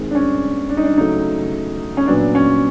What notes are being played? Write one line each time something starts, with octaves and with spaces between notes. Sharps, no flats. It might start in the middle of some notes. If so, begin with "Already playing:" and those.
Already playing: D#3 G#3 C4
D4
C#4
D4
D#4
D4
C#3 F#3 A3 D#4
C#4
A#2 F#3 B3 D4
C#4